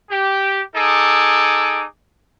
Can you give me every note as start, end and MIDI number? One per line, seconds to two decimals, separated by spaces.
0.10 0.61 67
0.75 1.84 63
0.75 1.84 68
0.75 1.84 69
0.75 1.84 86